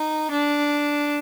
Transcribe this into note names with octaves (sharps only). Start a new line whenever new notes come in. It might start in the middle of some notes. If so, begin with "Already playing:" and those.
Already playing: D#4
D4